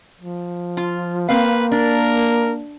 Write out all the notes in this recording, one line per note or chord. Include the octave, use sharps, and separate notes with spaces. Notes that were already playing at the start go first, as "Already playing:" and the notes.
F3
F4
A#3 C4 B4 F5
D4 A#4